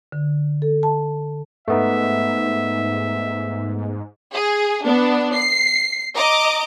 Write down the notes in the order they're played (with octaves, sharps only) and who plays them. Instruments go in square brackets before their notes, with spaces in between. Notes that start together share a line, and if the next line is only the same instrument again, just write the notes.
[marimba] D3
A4
A5
[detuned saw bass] G#2 [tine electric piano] A3 B3 D#4 [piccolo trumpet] E5
[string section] G#4
B3 D4
C7
D#5 A#5 D6